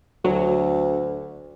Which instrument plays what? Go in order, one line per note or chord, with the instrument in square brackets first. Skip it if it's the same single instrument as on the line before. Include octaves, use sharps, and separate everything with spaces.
[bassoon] D2 [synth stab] F#3